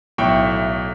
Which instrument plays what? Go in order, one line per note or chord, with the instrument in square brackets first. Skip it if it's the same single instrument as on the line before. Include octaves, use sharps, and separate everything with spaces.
[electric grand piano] B1 A2 E5 G5 C#6